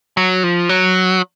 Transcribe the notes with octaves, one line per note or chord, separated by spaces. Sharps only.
F#3
F3
F#3